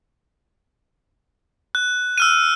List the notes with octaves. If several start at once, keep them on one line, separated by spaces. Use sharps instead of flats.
F#6
E6 F6 D#7